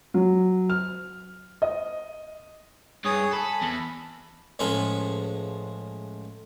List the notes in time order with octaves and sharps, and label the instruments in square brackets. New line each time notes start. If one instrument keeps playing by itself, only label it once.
[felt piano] F#3
F6
D#5
[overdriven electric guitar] G2 [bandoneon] G#4 C#5 D#6
[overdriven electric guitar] A4 [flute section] G#5 A5 [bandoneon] B5
[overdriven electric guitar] E2
[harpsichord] C#2 A2 F3 G#3 F4 B5